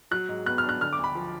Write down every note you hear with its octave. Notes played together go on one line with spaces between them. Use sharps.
F#3 F#6
G#2
B3 F#6
F6
D4
F#6
D3 F6
D6
D2
B5
F3